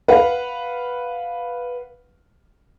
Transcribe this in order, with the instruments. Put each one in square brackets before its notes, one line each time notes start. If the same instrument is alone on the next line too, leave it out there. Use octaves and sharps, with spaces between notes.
[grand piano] B4 F5 F#5